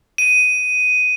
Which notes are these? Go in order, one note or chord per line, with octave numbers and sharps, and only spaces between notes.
D#7